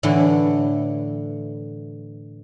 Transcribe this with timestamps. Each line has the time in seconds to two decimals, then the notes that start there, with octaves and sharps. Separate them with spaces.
0.03 A2 D3 E3